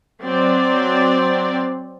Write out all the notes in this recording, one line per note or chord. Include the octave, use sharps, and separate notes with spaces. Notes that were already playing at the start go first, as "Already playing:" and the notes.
F#3 C4 D5